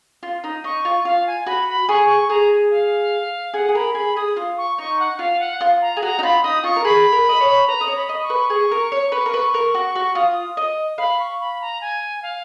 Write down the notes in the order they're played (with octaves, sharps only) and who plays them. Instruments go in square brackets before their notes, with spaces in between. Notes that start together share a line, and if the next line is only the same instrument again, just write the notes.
[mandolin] F4
D#4
[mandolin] D#4 [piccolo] C#6
[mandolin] F4
[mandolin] F4 [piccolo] F5
[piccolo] G#5
[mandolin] F#4 [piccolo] B5
[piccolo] B5
[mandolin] G#4 [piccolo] C#6
[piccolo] C#6
[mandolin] G#4 [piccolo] A#5
[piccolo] G#5
F5
[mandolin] G#4 [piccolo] F#5
[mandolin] G#4
[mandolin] A#4 [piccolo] B5
[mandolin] G#4 [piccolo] B5
[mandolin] G#4 [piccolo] D#6
[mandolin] F4
[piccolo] C#6
[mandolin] D#4 [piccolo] C#6
[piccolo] F#5
[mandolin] F4 [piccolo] F5
[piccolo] F#5
[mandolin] F4
[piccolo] A#5
[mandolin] G#4
[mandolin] F#4 [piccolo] A#5
[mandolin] D#4
[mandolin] F4 [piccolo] B5
[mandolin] D#4 [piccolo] D#6
[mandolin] F4 [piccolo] C#6
[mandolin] A#4
[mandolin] G#4 [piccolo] B5
[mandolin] A#4
D#5
C#5
[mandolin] B4 [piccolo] A#5
[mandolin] D#5
C#5
[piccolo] B5
[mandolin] D#5
[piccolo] C#6
[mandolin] B4
G#4
A#4
C#5
B4
A#4
B4
A#4
F#4
F#4
[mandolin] F4 [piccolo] D#6
[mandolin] D#5
[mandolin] F5 [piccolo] B5
[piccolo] C#6
B5
A#5
G#5
F5